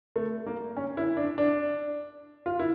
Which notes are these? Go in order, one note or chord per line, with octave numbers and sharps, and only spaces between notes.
A3
A#3
C#4
E4
D4
D4
F4
E4